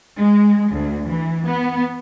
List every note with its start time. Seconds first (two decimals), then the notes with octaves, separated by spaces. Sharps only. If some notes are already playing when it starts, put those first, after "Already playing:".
0.19 G#3
0.73 D2
1.08 E3
1.47 B3